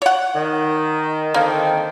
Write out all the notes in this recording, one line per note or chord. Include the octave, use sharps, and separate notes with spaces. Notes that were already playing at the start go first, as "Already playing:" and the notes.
C#5 F#5
D#3
D3 D#3 A#3 C4